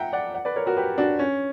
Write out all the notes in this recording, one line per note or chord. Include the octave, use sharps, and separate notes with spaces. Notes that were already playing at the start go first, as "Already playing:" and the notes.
Already playing: E5 F#5 G5 A#5
D5 F#5
D5 F#5
B4 D5
A#4 C#5
F#4 A#4
G4 B4
D4 F#4
C#4